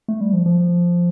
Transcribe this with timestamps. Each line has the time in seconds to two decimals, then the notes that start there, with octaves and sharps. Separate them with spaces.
0.08 A3
0.21 G3
0.33 F3
0.46 F3